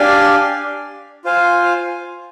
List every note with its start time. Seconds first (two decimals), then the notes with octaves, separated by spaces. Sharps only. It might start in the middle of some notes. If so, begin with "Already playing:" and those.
Already playing: D4 G4 D5 F5 G#5
1.24 F4 C5 F5 G#5